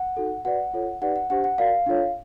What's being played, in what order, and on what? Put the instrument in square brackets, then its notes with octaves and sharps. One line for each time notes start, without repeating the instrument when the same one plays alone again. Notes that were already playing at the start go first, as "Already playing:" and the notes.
Already playing: [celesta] F#5
D#4 F#4 A4
F#4 B4 D5 F#5
F4 A4 C#5
D#4 G4 B4 D5 F#5
F#5
D4 G4 C5 F#5
F#5
F#4 A#4 D5 F5
D4 F4 A4 C#5